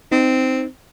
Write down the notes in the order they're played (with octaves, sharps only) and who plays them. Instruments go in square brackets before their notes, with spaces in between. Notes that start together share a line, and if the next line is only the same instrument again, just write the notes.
[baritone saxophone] C4 [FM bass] D#4